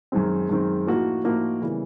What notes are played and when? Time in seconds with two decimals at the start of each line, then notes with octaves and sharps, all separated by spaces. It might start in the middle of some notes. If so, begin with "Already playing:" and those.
0.12 F#2 D#3 G#3 C4
0.49 F#2 D#3 G#3 C4
0.87 A2 F3 A#3 D#4 F#4
1.24 A2 F3 A#3 D#4 F#4
1.61 C#3 E3 G3 B3